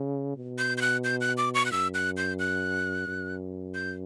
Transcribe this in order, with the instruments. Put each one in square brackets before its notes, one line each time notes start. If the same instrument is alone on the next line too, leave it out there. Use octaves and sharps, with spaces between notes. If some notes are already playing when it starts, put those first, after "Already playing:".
Already playing: [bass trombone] C#3
B2
[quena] G6
G6
F#6
G6
F#6
D6
C#6
F#6
[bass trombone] F#2 [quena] E6
[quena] F#6
G6
F#6
[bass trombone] F#2
[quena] G6